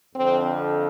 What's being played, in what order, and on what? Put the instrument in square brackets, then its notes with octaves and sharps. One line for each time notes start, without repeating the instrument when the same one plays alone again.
[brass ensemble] F2 D3 C4